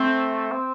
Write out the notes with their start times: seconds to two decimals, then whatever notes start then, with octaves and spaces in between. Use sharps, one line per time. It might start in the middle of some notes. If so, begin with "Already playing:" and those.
Already playing: A3 C4
0.52 C4